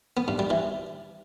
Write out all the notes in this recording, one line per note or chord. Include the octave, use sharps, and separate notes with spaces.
B3
G2
G3
E3